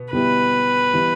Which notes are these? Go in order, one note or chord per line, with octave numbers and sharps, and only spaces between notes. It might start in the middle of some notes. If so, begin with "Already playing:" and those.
Already playing: B2 B3
B2 G3 B3 E4 B4
E3 G3 B3